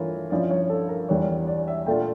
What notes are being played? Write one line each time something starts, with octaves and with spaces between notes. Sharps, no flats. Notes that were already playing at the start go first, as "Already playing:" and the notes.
Already playing: G2 E3 A3 F4 A#4 C#5
G2 F3 C#4 E4 D5
C#5
A4
A#4
E2 E3 G3 D4 C#5
D5
E5
A#2 A3 D4 F4 G5